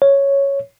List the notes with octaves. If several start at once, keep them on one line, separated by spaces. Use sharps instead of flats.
C#5